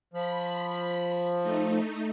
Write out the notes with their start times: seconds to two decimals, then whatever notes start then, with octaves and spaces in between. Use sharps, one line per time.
0.14 F3 B5
1.42 A3 D#4